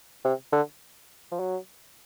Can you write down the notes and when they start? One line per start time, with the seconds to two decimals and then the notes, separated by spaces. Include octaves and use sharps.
0.25 C3
0.52 D3
1.32 F3
1.40 F#3